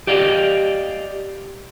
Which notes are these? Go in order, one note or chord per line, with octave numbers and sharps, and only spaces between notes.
G4 D5 D#5 F5